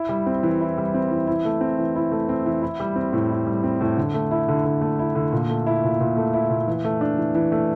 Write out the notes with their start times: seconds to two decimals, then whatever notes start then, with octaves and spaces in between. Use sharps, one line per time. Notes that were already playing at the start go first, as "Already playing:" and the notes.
Already playing: E4
0.09 G3
0.26 C4
0.43 E3
0.61 E4
0.78 G3
0.94 C4
1.11 E3
1.27 E4
1.45 A3
1.61 C4
1.78 E3
1.96 E4
2.12 A3
2.29 C4
2.46 E3
2.62 E4
2.80 G3
2.96 C4
3.13 A2
3.31 E4
3.47 G3
3.64 C4
3.81 A2
3.97 D3
4.14 A3
4.31 E4
4.48 D3
4.65 D3
4.81 A3
4.99 E4
5.15 D3
5.32 A#2
5.49 A3
5.67 E4
5.84 A#2
6.00 A#2
6.17 A3
6.33 E4
6.50 A#2
6.68 E3
6.85 A3
7.01 D4
7.18 E3
7.35 E3
7.52 A3